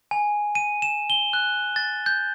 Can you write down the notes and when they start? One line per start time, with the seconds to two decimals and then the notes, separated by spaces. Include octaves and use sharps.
0.11 G#5
0.55 D#7
0.82 E7
1.10 G7
1.33 F#6
1.76 A6
2.06 G6